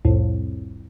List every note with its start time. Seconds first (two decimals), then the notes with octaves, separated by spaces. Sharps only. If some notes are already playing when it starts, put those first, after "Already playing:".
0.05 C2 F2 A2